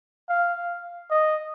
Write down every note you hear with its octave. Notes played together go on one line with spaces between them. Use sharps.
F5
D#5